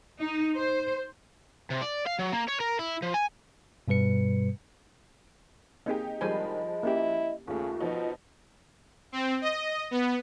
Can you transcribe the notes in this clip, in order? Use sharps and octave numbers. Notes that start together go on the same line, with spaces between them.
D#4
C5
C3
D5
F5
F#3
A#3
C#5
A#4
E4
F3
G#5
G2 B2 G3 B4 C#7
A#3 C4 D#4 G4 G#4
D#3 F3 G3 G#3 C5 D#5 G#5 B5
A#3 C#4 E4 G4
D#2 C#3 A3 F4
B2 F3 D#4
C4
D#5
B3